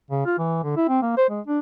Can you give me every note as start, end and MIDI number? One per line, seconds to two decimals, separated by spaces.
0.11 0.22 49
0.25 0.33 65
0.38 0.58 52
0.63 0.73 50
0.77 0.87 64
0.88 1.00 60
1.02 1.14 58
1.17 1.25 72
1.30 1.40 56
1.47 1.59 62